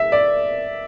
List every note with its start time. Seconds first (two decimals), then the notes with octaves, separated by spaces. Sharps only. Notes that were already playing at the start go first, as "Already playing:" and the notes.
Already playing: E5
0.12 D5